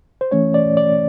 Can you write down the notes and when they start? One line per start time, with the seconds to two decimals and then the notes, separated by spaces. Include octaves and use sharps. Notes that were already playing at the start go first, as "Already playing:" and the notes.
0.21 C5
0.31 E3 A3 C#4 C#5
0.54 D5
0.77 D5